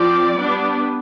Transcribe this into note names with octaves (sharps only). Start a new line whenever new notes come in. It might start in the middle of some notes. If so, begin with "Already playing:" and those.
Already playing: F3 C4 D5
G3 B3 D4